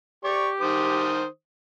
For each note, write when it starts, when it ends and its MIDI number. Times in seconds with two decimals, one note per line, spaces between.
0.24 1.10 67
0.24 0.49 74
0.24 0.49 85
0.60 1.25 51
0.60 1.25 72
0.60 1.25 87